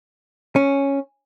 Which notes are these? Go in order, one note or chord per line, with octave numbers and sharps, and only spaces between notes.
C#4